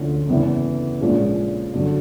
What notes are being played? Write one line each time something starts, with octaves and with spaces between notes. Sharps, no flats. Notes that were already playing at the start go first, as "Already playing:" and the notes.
Already playing: D2 D3 F3 A3 C#4
E2 C#3 E3
A#1 A#2 F3 G#3 C#4
G2 D3 F#3